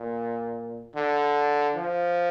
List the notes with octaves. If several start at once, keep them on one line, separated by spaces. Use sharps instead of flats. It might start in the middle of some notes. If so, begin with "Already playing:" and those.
Already playing: A#2
D3
F3